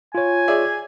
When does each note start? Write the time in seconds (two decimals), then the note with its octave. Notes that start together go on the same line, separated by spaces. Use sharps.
0.15 F4 C#5 G#5
0.48 G#4 D5 E5